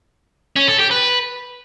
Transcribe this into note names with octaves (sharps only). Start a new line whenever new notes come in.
C#4
A4
G4
B4